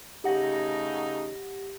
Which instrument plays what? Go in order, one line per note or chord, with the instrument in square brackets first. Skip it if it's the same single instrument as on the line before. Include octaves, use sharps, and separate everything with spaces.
[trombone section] C#3 A3 D#4 [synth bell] G4 F#5 A#6